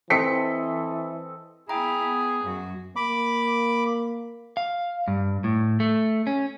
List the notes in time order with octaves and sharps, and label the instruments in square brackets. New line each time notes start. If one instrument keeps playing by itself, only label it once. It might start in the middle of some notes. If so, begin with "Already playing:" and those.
[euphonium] E3 [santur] C4 A4 D#5 [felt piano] B6 C#7
[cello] B3 E4 [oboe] G#4 [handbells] G5 A#5
[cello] B3
F#2 F#4
[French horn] A#3 [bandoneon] B5 D6
[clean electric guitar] F5
G2
A2
A3
C#4